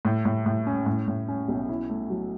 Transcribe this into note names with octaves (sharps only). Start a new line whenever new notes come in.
A2
A2
A2
C#4
A2
A2
C#4
B1
E4
A3
F#3